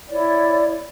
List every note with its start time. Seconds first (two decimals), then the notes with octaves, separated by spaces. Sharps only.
0.09 E4 C#5 D5